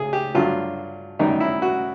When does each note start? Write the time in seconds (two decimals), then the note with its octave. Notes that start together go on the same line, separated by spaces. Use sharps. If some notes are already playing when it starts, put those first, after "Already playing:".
Already playing: C#2 G#4
0.13 G4
0.34 G2 D3 F#3 F4
1.19 F#2 D#3 G3 D#4
1.40 E4
1.62 F#4